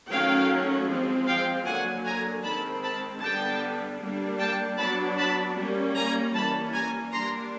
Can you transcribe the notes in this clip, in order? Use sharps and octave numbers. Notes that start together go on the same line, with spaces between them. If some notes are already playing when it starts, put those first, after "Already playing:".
D#3 F#3 A3 C#4 F5 G5
F3 G#3 C4
F5 G5
D3 F#3 A#3 F#5 G#5
G#5 A#5
D#3 G#3 C4 A5 B5
A5 B5
D3 G3 B3 D4 G5 A5
G3 A#3 D4
G5 A5
F#3 B3 D4 A5 B5
A5 B5
G3 A#3 C#4
G#5 A#5
E3 G3 A#3 C#4 A5 B5
G#5 A#5
G3 A#3 D4 A#5 C6